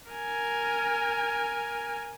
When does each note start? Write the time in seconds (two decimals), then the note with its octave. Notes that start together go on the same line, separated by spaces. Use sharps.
0.12 A#4 G#5